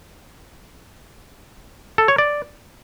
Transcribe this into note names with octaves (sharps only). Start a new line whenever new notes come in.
A4
C#5
D5